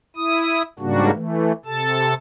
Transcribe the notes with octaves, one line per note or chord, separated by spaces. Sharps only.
E4 D#6
G#2 C#3 G3 A#3 D4 F#4
E3 A3
C3 A4 A5